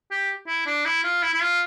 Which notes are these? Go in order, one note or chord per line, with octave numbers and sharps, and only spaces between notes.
G4
E4
D4
E4
F4
E4
E4
F4